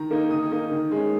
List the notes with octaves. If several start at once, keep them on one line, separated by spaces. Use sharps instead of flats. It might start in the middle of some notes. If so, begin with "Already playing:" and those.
Already playing: D#3 A#5
A#3 D#4
D#3 D#6
A#3 D#4
D#3
G#3 C#4